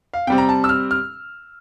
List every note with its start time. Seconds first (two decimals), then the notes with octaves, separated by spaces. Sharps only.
0.13 F5
0.27 C3 G3 C4 G5
0.38 A#5
0.49 A5
0.64 E6
0.69 F6
0.91 F6